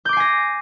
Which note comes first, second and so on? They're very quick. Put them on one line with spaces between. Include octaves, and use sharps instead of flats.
G6 D6 C7 G#5 A#6